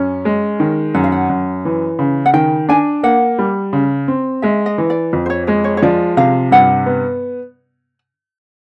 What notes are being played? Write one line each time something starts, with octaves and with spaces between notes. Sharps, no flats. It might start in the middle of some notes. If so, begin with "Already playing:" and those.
Already playing: F#2 C#4
G#3
D#3
F#2 F#5
F5
F#5
F#2
E3
C#3
F#5
D#3 G5
D4 G#5
A#3 F#5
G3
C#3
C4
G#3 E5
D#5
E3
D5
F2
C5
C#5
G#3 C#5
C#5
C#5
F3 D5
C3 F5
G2 F#5
B3